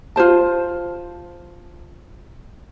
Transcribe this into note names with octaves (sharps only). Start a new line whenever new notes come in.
F4 G#4 C5 A5